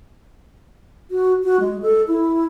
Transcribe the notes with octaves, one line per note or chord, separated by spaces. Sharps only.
F#4
F#4
G#3
A4
E4